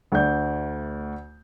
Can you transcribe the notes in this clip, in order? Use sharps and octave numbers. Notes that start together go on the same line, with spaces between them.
D2 A3 D5 G6